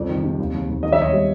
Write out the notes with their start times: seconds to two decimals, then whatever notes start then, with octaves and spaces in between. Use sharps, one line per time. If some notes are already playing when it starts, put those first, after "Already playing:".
Already playing: C2 F2 D5
0.09 D#3
0.24 C3
0.39 D#2
0.54 D#2
0.69 D#2
0.83 D#3 D#5
0.92 E5
0.99 D#2 C#5 D#5
1.13 G3